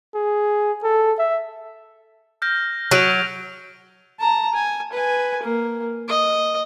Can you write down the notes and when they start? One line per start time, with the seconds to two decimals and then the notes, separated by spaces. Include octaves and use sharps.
0.15 G#4
0.83 A4
1.19 E5
2.42 F6 G6 A#6
2.91 F#3 C#6 D7 F7
4.20 A5 A#5
4.54 G#5
4.93 B4 G#5
5.43 A#3
6.08 D#5